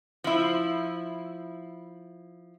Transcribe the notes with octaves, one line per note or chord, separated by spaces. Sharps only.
F3 E4